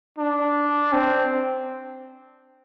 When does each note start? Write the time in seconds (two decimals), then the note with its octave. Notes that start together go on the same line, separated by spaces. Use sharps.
0.19 D4
0.93 C4